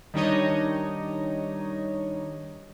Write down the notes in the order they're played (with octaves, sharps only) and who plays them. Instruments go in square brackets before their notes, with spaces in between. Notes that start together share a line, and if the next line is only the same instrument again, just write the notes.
[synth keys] D#3 G3 D4 D#4 C#5 D#5